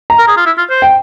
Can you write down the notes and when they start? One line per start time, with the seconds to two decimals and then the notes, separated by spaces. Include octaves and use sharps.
0.10 A#5
0.19 A#4
0.28 G#4
0.37 F4
0.46 E4
0.58 F4
0.70 C5
0.82 G5